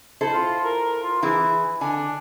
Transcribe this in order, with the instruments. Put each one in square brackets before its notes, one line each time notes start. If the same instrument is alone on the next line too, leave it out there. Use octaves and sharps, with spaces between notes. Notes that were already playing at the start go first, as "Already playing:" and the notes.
[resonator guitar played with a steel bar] E4 A4 C5
[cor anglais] F4
A#4
F4
[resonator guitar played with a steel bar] E3 E4 G#4 [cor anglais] B4
[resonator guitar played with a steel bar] D3 G#5 [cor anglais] D4